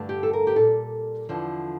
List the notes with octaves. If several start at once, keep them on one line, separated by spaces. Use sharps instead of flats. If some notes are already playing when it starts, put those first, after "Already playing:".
Already playing: G2 D3 A3
G4
A4
A#4
G4
A#2 G3 A4
E2 D3 F3